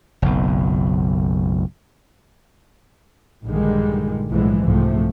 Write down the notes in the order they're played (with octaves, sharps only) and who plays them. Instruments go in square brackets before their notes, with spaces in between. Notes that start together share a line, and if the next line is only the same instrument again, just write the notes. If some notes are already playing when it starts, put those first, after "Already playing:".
[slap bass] F#1 B1
[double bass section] A#1 G2 D3 D#3 G3 G#3
B1 A2 D3 E3 F3 G#3
C2 G#2 C3 F3 A3